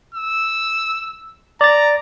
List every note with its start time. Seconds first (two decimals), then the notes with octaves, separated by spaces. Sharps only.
0.15 E6
1.61 D5 A#5 A6